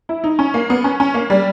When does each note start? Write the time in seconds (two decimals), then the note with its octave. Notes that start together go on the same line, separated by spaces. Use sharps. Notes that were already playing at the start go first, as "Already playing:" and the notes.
0.09 E4
0.24 D#4
0.39 C#4
0.54 A#3
0.70 B3
0.84 C#4
1.00 C#4
1.14 A#3
1.30 G3